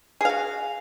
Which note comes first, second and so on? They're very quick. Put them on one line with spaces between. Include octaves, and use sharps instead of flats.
G#4 F5 F#4